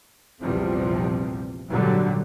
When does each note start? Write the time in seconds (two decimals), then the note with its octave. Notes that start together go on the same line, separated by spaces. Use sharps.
0.41 A#1 E2 C3 F3 G3 C4
1.68 G#1 A#2 D3 F#3 G3